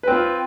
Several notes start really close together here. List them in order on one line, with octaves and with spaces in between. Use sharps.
B4 C4 F4